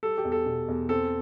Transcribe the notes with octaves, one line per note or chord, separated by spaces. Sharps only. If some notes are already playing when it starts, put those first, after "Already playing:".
G3 A4
G4
E2
A4
B2
E2
C4 A4